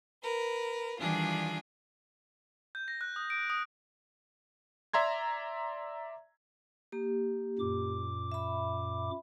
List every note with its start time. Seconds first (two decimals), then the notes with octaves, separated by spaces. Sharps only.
0.22 A#4 B4
0.99 D#3 E3 G3 D4 F4 G#4
2.75 G6
2.88 A#6
3.01 F#6
3.16 D#6
3.30 D7
3.50 D#6
4.93 D5 E5 A#5 C6 G#6
6.92 A#3 G4
7.59 F#2 A#2 D6
8.32 E5 B5